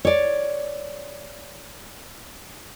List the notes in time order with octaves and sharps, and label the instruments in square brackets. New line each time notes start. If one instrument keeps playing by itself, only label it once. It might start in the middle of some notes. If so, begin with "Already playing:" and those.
[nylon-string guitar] C#5 D5